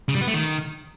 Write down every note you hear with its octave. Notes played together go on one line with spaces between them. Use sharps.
C#3
G3
B3
A3
D#3